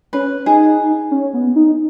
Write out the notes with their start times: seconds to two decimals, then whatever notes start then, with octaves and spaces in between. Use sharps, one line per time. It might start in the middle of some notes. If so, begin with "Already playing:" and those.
0.13 C#4 B4
0.46 D#4 G#4
1.11 C#4
1.34 B3
1.56 D#4